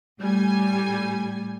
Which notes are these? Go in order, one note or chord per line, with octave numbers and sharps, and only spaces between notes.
A2 G3 G#5